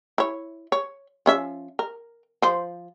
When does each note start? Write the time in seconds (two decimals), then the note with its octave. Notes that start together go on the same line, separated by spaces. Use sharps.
0.18 E4 C#5
0.72 C#5
1.26 F3 C#4 E5
1.79 A#4
2.42 F3 C5